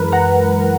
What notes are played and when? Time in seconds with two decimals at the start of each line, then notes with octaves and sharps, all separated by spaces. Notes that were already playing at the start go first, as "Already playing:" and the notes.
Already playing: F#2 E3 G#3 A#4 B4
0.12 F#5 A#5